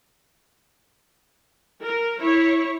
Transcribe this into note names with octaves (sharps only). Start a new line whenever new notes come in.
A#4
E4 C#5